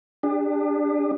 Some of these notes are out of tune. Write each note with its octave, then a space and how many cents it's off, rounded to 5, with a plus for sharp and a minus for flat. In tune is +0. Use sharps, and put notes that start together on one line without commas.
D4 +0 G4 +45